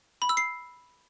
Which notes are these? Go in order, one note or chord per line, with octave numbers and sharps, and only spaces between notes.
B5
E6
C7